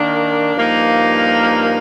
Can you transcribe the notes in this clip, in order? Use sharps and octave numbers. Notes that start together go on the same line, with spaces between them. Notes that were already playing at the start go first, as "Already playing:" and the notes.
Already playing: D#3 A#3 D4
G2 F3 A#3 D#4